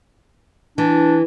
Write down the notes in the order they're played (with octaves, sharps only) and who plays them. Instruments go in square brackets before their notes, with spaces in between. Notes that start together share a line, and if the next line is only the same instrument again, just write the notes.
[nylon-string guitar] E3 [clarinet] D4